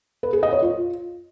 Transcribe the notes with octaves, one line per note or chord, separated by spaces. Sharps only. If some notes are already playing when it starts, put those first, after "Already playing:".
B4
G#4
D#5
C#5
F4